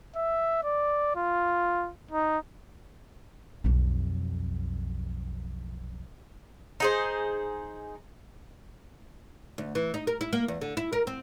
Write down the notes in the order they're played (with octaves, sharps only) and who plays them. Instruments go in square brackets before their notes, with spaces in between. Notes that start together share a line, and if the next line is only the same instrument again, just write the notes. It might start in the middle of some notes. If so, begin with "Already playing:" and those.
[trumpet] E5
D5
F4
D#4
[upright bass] B1 F2
[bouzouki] D#4 G#4 C5
[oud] D2
E3
D#4
A#4
E4
A#3
E2
D3
E4
A#4
C4